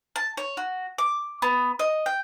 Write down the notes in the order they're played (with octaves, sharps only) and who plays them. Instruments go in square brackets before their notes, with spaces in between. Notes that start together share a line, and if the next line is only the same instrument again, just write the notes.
[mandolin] A5
C#5
F#4
D6
B3
D#5
G5